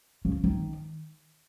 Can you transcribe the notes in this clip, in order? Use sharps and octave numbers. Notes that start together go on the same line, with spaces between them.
C#3
D#3